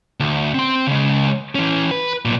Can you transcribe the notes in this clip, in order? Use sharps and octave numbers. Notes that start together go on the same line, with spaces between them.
D2
C4 C6
C#3 G#3
E3 C#4
B4
B1 A#2